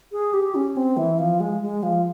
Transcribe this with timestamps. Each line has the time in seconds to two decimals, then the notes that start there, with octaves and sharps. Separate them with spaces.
0.12 G#4
0.33 G4
0.55 C#4
0.76 C4
0.97 E3
1.18 F3
1.40 G#3
1.62 G#3
1.83 F3